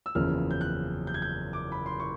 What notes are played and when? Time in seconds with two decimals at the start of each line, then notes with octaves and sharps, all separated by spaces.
0.06 E6
0.15 F#1 E2 C#3 F3 F6
0.51 G6
0.61 F#6
1.07 G6
1.14 G#6
1.22 G6
1.53 D6
1.72 B5
1.86 C6
2.00 C#6